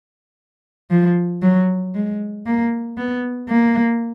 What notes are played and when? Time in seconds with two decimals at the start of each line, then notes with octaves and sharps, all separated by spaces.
0.91 F3
1.42 F#3
1.95 G#3
2.46 A#3
2.97 B3
3.49 A#3